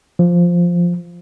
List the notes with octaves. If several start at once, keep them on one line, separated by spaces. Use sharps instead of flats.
F3